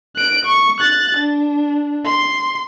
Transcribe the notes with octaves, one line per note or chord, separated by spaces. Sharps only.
F#6 D7
C#6
F#6 A6
D4
C6